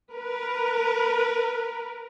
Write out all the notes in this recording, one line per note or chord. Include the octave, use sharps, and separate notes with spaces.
A#4 B4